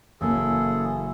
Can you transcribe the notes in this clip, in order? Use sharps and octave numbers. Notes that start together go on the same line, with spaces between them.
F#1 E3 A#3 C#4 G#4 A4